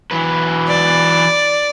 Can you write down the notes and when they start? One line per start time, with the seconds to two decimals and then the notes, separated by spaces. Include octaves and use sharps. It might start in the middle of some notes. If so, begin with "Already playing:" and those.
0.11 E3 F#3 B4
0.68 D5